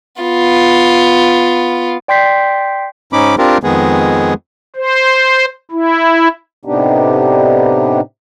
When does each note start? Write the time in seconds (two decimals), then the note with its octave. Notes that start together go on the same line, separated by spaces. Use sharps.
0.22 B3 F4
2.08 D5 G5 C6 G6 B6 C7
3.13 G#2 C#4 D#4 B5 D6
3.38 C4 D4 F4 G4 A#4
3.63 F2 D#3 G#3 B3 G#4
4.76 C5
5.71 E4
6.65 A2 C3 B3 D4 D#4 G4